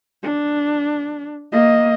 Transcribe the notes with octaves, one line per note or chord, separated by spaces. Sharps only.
D4
A#3 D#5